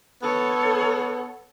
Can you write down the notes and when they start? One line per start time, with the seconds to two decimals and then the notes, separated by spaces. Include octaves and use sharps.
0.22 B3 A4 C#5